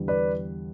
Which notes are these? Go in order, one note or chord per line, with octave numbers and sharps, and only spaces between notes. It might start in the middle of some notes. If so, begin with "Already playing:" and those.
Already playing: E2 D3 G3
B4 D5